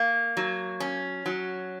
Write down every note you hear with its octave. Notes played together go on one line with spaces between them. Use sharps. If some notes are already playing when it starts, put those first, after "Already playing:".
Already playing: A#3
F#3
C#4
F#3